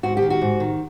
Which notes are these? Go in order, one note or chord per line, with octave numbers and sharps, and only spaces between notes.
G#2 F#4
G4
D#3
F#4
G#2
D#3